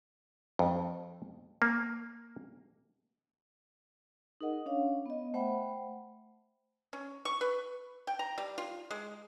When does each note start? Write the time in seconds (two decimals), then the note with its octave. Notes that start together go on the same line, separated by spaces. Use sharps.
0.59 F2
1.62 A#3
4.41 D#4 G#4 A#4 D#5 F#5
4.66 C#4 D4 C#5 F5
5.06 B3 D#5
5.34 A3 C5 E5 F#5 G5 B5
6.93 C#4
7.25 C#6
7.41 B4
8.07 G5
8.19 A#5
8.38 G3
8.58 F4
8.91 G#3